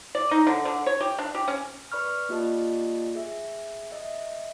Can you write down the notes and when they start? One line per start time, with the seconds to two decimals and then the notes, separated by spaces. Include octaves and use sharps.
0.15 D5
0.31 D#4
0.47 D3
0.65 D3
0.86 C#5
1.01 G4
1.18 D4
1.35 G4
1.48 C#4
1.92 B4 D5 B5 C#6 F6
2.29 A#3 F4 G4 D5 D#5 A5
3.15 G#4 E5
3.91 D#5 E5